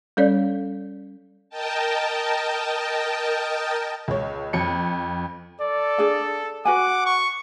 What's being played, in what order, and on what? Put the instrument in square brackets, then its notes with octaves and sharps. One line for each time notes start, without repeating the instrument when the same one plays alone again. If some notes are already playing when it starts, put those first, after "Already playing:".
[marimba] G3 C#4 A4 C#5 D5
[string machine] A#4 D#5 G5 A5
[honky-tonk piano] C#2 C#5
F2 C#7
[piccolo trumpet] A4 [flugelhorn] D5
[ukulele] D4 G#4 F5
[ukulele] F#4 B4 G#5 [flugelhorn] F#5 [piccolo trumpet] D6
[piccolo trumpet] C#6